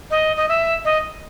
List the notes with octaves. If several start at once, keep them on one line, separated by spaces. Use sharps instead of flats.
D#5
D#5
E5
D#5